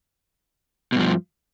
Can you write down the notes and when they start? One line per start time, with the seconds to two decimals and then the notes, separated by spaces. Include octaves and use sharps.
0.92 B2
0.96 G2
1.00 F3